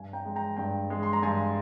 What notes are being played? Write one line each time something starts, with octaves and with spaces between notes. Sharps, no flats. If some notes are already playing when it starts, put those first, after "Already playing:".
Already playing: G2 G#5
G5 A#5
G#3
G5 A#5
G2 G5
G#3
C6
A#5
G2 G#5